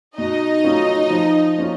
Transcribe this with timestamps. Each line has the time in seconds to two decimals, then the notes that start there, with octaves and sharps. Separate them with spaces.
0.17 B2 D#4 D#5
0.64 F#3 A3 C#4 F4
1.10 F3
1.56 A#3 C#4 F4